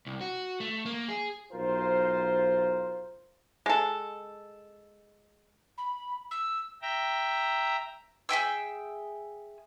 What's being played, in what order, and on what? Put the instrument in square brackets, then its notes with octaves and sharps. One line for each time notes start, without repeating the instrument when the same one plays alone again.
[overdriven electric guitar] C2
F#4
A3
A#3
G#4
[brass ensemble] B1 F4 A#4 C5
[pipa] G#3 A4
[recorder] B5
E6
[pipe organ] E5 G5 A#5
[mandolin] G#4 E5 G5 E6